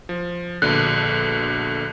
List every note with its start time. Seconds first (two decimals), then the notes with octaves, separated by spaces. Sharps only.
0.09 F3
0.62 A#1 B2 D3 F#6